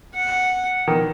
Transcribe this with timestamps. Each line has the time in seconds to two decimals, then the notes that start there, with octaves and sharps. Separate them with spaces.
0.14 F#5
0.88 D#3